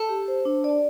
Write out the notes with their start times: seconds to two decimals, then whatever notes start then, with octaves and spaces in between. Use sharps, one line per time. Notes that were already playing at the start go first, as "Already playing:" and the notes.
Already playing: A4
0.09 G4
0.28 C5
0.45 D4
0.64 D5